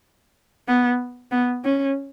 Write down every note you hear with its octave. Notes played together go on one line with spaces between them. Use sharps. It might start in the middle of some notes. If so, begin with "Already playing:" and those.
B3
B3
C#4